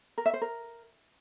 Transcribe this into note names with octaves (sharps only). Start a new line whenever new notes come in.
A#4
E5
C5
A#4